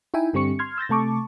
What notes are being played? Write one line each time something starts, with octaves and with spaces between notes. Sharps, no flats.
D#4 E4 E5 G5 G#5
G2 D3 G3 C4 C#6 C#7
C6 F6 G#6
E6 G6 A6 A#6
C3 A3 A5 C#6 D6